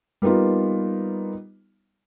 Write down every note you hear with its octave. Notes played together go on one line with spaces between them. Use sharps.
G3 A#3 B3 D#4 F4